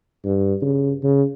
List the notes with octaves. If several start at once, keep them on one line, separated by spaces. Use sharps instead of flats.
G2
C#3
C#3